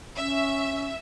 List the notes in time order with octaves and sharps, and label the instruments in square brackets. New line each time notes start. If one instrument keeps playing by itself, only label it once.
[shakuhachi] C#4 [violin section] E5